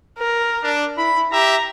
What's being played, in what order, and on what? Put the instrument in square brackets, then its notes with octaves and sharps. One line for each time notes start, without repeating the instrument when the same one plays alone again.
[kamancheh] A#4
[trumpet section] D4
[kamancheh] E4 [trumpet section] B5
[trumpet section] G4 E5 [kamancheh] A#5